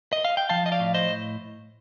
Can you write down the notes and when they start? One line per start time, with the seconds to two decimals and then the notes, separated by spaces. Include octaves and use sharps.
0.13 D#5
0.25 F5
0.37 G5
0.49 F3 F5 A5
0.66 D#5
0.72 D5 F5
0.80 A2
0.94 C5 D#5